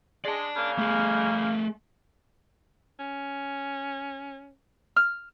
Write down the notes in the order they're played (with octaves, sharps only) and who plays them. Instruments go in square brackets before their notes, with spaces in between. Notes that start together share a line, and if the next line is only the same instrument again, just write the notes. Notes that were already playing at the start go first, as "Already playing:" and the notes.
[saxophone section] G#3 [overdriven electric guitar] D5 A5
[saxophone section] C#3 A#3
[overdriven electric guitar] A3 G#4
[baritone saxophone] C#4
[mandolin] F6